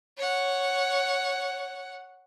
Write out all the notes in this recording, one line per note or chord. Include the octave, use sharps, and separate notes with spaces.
C#5 F#5